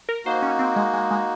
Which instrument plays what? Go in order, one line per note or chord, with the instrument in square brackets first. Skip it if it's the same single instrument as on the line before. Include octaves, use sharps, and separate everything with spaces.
[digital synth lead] A#4
[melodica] A#3 D#4 F#4 [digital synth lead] C5
[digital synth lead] C#4
C4
G#3
G#3
G#3